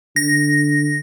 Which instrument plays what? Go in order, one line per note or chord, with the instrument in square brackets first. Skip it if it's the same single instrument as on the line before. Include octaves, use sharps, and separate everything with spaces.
[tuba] D3 [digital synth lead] A#6